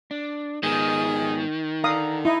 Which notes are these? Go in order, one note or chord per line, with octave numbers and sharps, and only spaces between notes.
D4
G#2 D#3 B3 G#4
D3 F5 A#5 D#6
D#4 E4